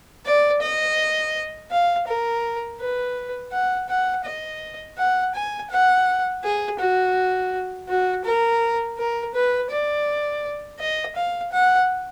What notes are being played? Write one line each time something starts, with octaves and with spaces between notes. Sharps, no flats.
D5
D#5
F5
A#4
B4
F#5
F#5
D#5
F#5
G#5
F#5
G#4
F#4
F#4
A#4
A#4
B4
D5
D#5
F5
F#5